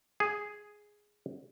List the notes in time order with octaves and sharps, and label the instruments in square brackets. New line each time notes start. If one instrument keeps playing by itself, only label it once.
[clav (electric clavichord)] G#4